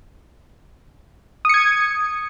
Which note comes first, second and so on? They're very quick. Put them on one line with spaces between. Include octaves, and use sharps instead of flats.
D#6 C#7 G#6